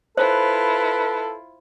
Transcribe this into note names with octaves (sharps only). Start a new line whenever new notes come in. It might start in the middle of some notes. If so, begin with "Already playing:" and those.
E4 F4 A4 B4 C5